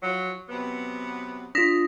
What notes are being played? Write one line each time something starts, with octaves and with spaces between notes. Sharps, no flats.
F3 F#3
C3 F#3 B3
D4 F4 D#6 A#6 B6